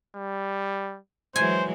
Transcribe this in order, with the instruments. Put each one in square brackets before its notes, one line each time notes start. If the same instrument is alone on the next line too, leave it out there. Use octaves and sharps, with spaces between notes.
[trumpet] G3
[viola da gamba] E3 F#3 G#3 [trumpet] C5 [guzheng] G#5